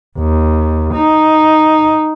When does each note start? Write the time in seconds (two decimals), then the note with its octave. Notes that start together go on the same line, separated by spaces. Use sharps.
0.19 D#2
0.94 D#4